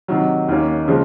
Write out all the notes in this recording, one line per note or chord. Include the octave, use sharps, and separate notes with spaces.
C3 D#3 F#3
D#2 D#3 A#3 C#4
C#3 F3 G#3